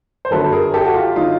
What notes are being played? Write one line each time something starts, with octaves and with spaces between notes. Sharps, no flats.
C5
G1 F#2 D3 F#3 A4 B4
G#4 A#4
G4 A4
F#4
F4 G4
D3 F#3 D#4 F4